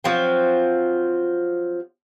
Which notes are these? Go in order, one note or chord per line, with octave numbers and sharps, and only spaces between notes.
F3 F#3 C4